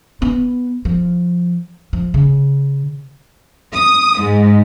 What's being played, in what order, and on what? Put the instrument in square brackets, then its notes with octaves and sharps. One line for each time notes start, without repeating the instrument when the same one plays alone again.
[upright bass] B3
F3
F3
C#3
[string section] D#6
G#2